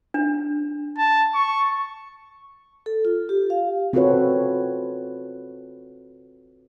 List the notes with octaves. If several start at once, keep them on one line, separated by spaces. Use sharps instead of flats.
D4
A5
C#6
A4
F4
G4
F5
C4 F4 F#4 A4 B4 C#5